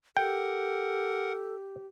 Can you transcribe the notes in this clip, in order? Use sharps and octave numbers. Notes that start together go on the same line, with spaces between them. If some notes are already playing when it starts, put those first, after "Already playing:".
G4 A4 A#4 F#5 G5